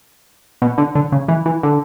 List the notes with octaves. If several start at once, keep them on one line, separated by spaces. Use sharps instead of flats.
B2
D3
D3
C#3
E3
E3
D3